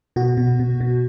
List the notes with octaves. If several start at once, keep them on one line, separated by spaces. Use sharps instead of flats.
B2 F#4
B2
B2
B2